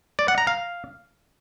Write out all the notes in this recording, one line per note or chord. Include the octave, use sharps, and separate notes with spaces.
D5
F#5
A#5
F5